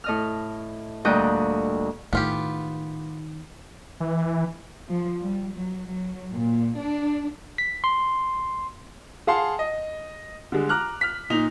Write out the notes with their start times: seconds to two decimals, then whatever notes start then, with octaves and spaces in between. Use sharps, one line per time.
0.04 A2 D#5 F6
1.05 D2 A#2 G3 D#5 G5 F#6
2.13 A2 D#3 B3 F4 G4
4.00 E3
4.88 F3
5.21 G3
5.53 F#3
5.88 F#3
6.30 A#2
6.77 D4
7.58 B6
7.84 C6
9.27 G#4 F5 F#5 A5 C6
9.59 D#5
10.52 D3 G3 G#3
10.69 A#5 D6 F6 F#6
11.01 F6 B6
11.30 A#2 D#4 F7